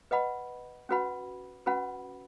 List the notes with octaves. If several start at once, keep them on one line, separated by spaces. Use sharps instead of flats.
B4 D#5 F#5 B5
C#4 F#4 B4 F#5 B5
C#4 F#4 B4 F#5 B5